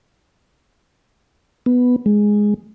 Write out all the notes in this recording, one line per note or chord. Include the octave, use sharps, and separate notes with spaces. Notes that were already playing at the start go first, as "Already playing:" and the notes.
B3
G#3